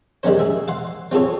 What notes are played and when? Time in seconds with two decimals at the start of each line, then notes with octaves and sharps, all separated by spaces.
0.23 G3 G#3 A#3 C#4 C5
0.39 G#4 E5
0.68 F5 F#5 C6
1.11 C4 F4 G#4 A4 C#5